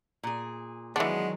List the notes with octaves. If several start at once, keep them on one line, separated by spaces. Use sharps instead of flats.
A#2 G#4
D#3 E3 F#3 G#3 B3 D4 F#5